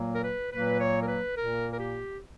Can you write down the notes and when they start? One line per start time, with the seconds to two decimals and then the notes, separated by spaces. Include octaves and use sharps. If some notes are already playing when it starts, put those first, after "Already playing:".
Already playing: A#2 F#3 A#3
0.13 A#4
0.22 B4
0.51 A#2 F#3 A#3 B4
0.79 C#5
1.02 A#4
1.08 B4
1.36 A#2 A#3 A#4
1.71 A#4
1.79 G4